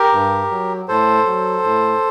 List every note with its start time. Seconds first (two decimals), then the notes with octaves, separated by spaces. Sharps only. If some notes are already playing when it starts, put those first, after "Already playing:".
Already playing: G4 A#4
0.13 G2
0.51 F#3
0.88 A2 A4 C5
1.26 F#3
1.64 A2